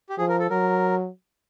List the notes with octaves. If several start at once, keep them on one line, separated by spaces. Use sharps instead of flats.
G4
F3 G#4
A#4
A4
F#3 A#4